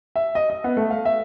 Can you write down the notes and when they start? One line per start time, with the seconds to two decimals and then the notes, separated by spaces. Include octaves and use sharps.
0.16 E5
0.35 D#5
0.50 D#5
0.64 B3
0.77 A3
0.90 F5
1.05 E5